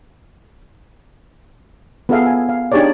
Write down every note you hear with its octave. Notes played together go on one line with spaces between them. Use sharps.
B3 F4 G#4 A4 E5 F5
G#5
F5
D4 D#4 G4 G#4 C#5 D5